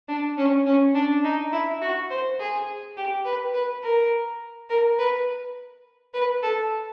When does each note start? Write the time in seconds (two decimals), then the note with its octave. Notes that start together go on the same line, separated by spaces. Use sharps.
0.08 D4
0.38 C#4
0.66 C#4
0.95 D4
1.24 D#4
1.52 E4
1.81 F#4
2.10 C5
2.39 G#4
2.97 G4
3.25 B4
3.54 B4
3.83 A#4
4.70 A#4
4.99 B4
6.14 B4
6.43 A4